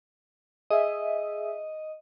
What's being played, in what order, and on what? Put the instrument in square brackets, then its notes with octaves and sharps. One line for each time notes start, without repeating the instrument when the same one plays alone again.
[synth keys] G#4 E5 [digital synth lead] D#5